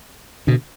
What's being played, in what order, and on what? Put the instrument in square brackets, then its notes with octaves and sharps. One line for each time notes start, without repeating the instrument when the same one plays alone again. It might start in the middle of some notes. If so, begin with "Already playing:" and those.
[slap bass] B2 D3